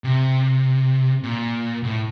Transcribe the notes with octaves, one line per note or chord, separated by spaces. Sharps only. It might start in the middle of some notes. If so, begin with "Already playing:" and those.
C3
A#2
A2